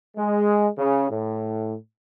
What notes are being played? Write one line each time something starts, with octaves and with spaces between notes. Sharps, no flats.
G#3
C#3
A2